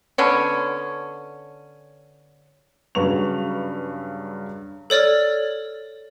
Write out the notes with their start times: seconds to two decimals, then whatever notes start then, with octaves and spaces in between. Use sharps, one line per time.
0.18 D3 B3 C#4
2.95 G2 C#3 F#3 B4 C#6 F7
4.90 A4 C#5 D5 F6 A6